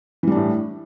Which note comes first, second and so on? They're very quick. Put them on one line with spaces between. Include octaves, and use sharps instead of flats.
E3 G3 D4 A2